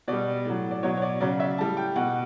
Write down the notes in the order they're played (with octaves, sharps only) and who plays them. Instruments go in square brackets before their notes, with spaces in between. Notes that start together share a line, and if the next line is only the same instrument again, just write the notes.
[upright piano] B2 G3 D5
A2 F#3
D5
B2 F#3 C#5
C#5
D5
C#3 F#3 D5
E5
A2 G3 A5
G5
B2 G3 F#5